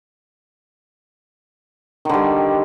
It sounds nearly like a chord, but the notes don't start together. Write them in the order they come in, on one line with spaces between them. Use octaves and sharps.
D#3 D3 G3